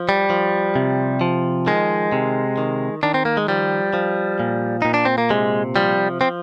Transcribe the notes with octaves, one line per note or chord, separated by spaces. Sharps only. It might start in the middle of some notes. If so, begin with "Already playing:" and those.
Already playing: F3
G3
F3
C3
F3
D#3 G#3
C3
D#3
D#3 D4
C4
A#3
G#3
F3 G3
F3
A#2
A#2 D#4
D4
C4
A#3
C3 G#3
F3 G3
F3 C4